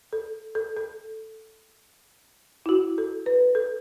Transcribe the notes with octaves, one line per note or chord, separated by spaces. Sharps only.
A4
A4
A4
E4
F#4
A4
B4
A4